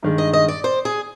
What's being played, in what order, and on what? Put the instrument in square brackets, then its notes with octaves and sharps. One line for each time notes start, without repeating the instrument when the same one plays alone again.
[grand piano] G2 D#3 G#3
[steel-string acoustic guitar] D#5
D#5
D5
C5
G#4